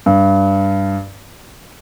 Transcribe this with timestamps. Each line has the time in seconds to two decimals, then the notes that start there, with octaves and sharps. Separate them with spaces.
0.06 G2